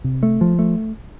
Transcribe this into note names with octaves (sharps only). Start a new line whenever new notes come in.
C3
A3
F3
A3